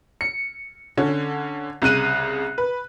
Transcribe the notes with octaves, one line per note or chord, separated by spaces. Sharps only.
C#7
D3 C#4
C2 C#3 F#6 D#7
B4